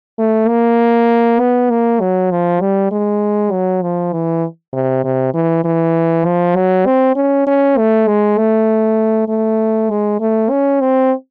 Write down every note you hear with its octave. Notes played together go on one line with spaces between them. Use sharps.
A3
A#3
B3
A#3
F#3
F3
G3
G#3
F#3
F3
E3
C3
C3
E3
E3
F3
F#3
C4
C#4
C#4
A3
G#3
A3
A3
G#3
A3
C#4
C4